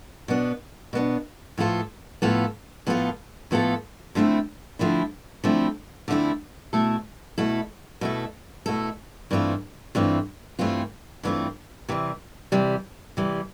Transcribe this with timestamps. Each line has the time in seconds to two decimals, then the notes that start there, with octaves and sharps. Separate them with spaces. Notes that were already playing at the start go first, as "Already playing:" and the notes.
0.28 B2 B3 D4
0.93 B2 B3 D4
1.58 A2 F3 B3 F4 A4
2.22 A2 F3 B3 F4 A4
2.87 A2 F3 B3 F4 A4
3.51 A2 F3 B3 F4 A4
4.15 D3 F3 A3 C4 E4
4.79 D3 F3 A3 C4 E4
5.44 D3 F3 A3 C4 E4
6.08 D3 F3 A3 C4 E4
6.73 B2 A3 E4 A4
7.38 B2 A3 E4 A4
8.01 B2 A3 E4 A4
8.66 B2 A3 E4 A4
9.31 G2 E3 A3 C4 F4
9.95 G2 E3 A3 C4 F4
10.59 G2 E3 A3 C4 F4
11.23 G2 E3 A3 C4 F4
11.89 C3 E3 G3
12.52 C3 E3 G3
13.17 C3 E3 G3